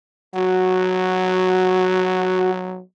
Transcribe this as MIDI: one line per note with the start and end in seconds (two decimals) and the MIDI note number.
0.35 2.81 54
0.35 2.50 66